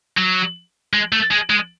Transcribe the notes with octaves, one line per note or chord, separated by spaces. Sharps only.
F#3
G#3
A3
G#3
G#3